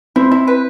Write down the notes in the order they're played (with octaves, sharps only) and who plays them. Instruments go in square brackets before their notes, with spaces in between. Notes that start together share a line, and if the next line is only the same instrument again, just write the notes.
[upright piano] C4 [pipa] E4
[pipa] E4
B4